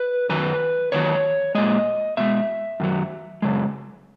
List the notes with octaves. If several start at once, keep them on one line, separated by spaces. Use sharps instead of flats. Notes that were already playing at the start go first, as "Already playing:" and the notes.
Already playing: B4
F#2 D#3 F#3 B4
E2 D#3 F#3 C#5
A#2 G#3 D#5
B2 G#3 E5
F#2 D#3 F#3
F#2 C#3 G#3